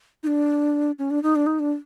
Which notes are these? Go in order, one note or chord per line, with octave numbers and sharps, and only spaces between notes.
D#4
D4
C#4
D4
D#4
D4
D#4
D4